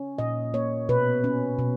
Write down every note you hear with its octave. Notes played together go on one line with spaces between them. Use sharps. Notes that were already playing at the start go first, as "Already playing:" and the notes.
Already playing: C#4
A#2 D#5
A#3 C#5
B2 B4
C#4
B2